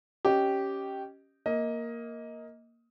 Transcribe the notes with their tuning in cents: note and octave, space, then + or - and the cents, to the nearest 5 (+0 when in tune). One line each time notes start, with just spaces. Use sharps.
C#4 +0 G4 -10 D#5 -5
A#3 +0 D#5 +20